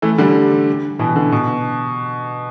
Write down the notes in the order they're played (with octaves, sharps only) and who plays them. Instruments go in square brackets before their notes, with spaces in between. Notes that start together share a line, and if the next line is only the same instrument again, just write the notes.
[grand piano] E3 A3
D3 G3
B2 E3
D3
B2